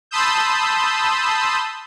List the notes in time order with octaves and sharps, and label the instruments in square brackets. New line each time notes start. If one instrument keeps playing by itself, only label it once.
[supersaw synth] A5 B5 C6 D#6 E6 G6